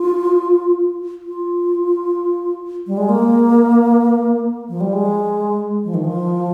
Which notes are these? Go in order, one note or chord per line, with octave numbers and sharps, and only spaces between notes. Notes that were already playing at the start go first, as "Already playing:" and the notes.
Already playing: F4
F4
G3
G#3
A#3
F3
G3
G#3
F3
D#3
F3